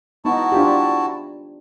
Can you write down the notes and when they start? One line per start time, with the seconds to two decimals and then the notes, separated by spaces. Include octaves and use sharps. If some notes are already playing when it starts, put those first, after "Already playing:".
0.25 B3 D#4 E4 F#4 A5
0.52 D4 F4 G4